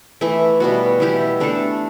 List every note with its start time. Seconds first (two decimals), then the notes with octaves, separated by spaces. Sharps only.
0.21 E3 A3 E4
0.60 B2 G3 B3 F#4
1.00 E3 B3 E4 G4
1.40 A3 D4 A4